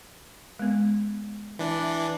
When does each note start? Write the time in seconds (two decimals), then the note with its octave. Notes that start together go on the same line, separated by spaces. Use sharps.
0.59 G#3 B3
1.59 E3 D4
1.71 E5